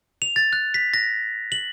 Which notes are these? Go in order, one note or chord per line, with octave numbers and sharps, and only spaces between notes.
F7
A6
F#6
B6
A#6
F#7